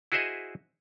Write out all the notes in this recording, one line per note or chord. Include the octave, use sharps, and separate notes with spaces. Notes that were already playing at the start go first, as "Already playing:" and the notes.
E4 F#4 G#4 C5 D#5 E5